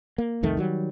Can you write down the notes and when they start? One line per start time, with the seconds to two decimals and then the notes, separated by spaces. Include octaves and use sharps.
0.18 A#3
0.43 C2 F2 D#3 A3
0.57 D#3 F#3 G3